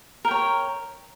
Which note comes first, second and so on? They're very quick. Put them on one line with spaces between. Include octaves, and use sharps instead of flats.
A#4 G5 C#5